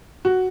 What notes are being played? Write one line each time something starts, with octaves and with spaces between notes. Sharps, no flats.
F#4